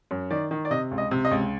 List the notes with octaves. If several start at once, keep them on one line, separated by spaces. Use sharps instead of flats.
F#2
D#3 D5
D#3
D5
C3 D#5
C#2
D#5
C3
D#5
C#2